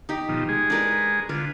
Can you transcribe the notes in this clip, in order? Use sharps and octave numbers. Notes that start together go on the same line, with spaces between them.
D#4 G4
B2 D#3 F3
G#3 G#4
D4 A#4 B4
D3 F4 B4